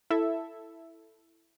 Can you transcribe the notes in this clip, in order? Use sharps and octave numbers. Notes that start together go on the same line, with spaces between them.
E4 A4 E5